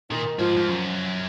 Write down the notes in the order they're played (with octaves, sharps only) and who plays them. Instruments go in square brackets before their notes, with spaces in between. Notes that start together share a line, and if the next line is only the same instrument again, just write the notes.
[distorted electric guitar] A#2 [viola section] D#3 D#4
[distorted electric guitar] G#2 [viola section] F3 F4
[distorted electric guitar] G#2
F#2